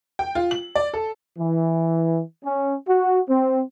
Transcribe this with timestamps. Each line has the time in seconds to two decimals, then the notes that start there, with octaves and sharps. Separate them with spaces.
0.19 G5
0.35 F4
0.51 F#7
0.75 D5
0.94 A4
1.39 E3
2.44 C#4
2.87 F#4
3.29 C4